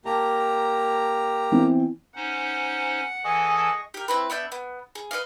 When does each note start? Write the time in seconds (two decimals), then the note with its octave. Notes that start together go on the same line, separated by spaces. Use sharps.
0.05 A#3 G4 A5 A#5
1.52 E3 B3 C4
2.16 C#4 D#4 C5 F#5
3.24 E3 G#4 A4 D#5 G#5 A5 C#6
3.94 G4 A#4
4.08 C4 E4 B4
4.30 B3 D4 E5 G6
4.52 B3
4.95 G#4
5.11 B4 D5 D#5 F5